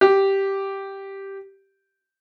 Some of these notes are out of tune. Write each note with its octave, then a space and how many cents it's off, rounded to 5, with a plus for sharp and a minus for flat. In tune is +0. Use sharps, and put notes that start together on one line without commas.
G4 -5